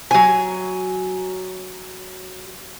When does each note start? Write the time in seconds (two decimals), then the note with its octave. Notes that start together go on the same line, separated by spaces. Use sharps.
0.11 F#3 G#5